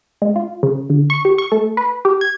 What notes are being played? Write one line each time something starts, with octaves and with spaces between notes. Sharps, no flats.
G#3
F4
C#3
D3
C#6
G4
C#6
A3
B4
G4
G#6